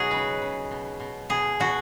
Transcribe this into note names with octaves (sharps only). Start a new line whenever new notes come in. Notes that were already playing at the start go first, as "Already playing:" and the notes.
Already playing: B2 F#3 D#4 F#4 G#4
C#3 B4
C#3
B2
B2
B2 G#4
B2 F#4